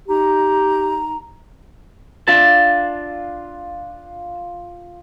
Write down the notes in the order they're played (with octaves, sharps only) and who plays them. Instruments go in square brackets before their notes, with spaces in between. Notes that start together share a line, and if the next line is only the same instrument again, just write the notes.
[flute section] D#4 A#5 [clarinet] G4
[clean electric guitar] D4 E5 A5 [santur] F4